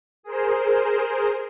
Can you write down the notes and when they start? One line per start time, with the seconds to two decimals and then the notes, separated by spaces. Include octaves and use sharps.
0.23 G#4 A#4 C5